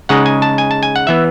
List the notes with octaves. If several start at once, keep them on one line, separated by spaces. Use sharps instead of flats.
C#3 G#3 D#4 F#5
G#5
A5
G#5
A5
G#5
F#5
E3 B3 E5